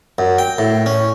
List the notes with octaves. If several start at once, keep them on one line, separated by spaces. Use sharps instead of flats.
F#2
G5
A2
C#4